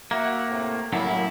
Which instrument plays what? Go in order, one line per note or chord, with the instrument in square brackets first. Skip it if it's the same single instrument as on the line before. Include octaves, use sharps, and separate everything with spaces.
[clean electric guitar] A#3 [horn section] F#4 E5 F#5
[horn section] A2 C3 A3
[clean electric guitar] F#2 A2 F#3 [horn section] G3 A#3 E4